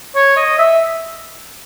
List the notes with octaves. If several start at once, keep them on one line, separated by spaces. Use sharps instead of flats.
C#5
D#5
E5